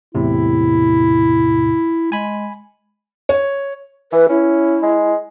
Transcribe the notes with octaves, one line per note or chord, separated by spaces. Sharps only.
E2 A2 C3 E4
G#3 G#5 B5
C#5
E3 B4
C#4 E4
G#3